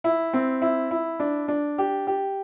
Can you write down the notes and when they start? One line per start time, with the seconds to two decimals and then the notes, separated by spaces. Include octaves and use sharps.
0.04 E4
0.33 C4
0.62 E4
0.91 E4
1.20 D4
1.48 D4
1.78 G4
2.07 G4